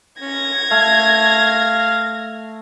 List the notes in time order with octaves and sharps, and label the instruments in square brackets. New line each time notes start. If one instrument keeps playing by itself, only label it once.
[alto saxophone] C#4 [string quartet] G#6 A#6
[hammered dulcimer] A3 [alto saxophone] F5